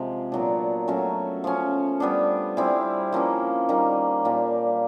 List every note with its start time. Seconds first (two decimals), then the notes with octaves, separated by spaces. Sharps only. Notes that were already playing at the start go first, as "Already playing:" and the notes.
Already playing: C3 F3 G#3 C4
0.32 A#2 F#3 B3 D4
0.88 F#3 A3 C#4 F#4
1.44 F3 A3 C#4
2.00 G3 B3 D4
2.57 G3 C4 E4 G#4
3.13 F3 A#3 C#4 E4
3.69 D#3 G3 A#3 D#4
4.25 A#2 G3 A#3 D4